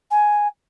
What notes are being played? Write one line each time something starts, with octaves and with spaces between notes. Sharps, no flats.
G#5